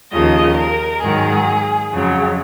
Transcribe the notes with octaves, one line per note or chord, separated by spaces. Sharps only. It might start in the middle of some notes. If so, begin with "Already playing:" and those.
D#2 C#3 F3 D#5
A#4
G#2 D#3 F#3 G#4
F2 C#3 F#3